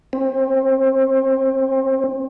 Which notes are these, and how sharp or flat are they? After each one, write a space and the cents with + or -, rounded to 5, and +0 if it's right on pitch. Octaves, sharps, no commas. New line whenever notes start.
C4 +30